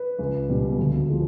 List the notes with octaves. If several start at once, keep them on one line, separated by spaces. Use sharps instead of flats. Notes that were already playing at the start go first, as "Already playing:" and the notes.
Already playing: B4
C#2
B2 G3
D2
F3 G#3